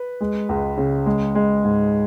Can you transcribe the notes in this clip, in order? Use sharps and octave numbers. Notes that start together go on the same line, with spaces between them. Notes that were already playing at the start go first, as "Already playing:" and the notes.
Already playing: B4
G#3
C#2
C#3
G#3
G#3
G#2